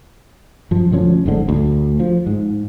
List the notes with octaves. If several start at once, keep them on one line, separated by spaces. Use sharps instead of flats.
F#2 F3
E1 D2 F3 C#4
F#1 G#2 D3
D2
F3
G#2